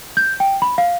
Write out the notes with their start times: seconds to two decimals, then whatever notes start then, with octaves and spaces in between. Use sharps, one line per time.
0.17 G6
0.40 G5
0.62 B5
0.78 F5